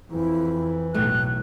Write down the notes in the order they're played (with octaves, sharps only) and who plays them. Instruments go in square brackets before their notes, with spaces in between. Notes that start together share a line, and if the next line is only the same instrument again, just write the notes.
[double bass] F2 [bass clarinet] E3 [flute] E4
[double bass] B1 [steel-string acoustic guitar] A2 A3 [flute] F#6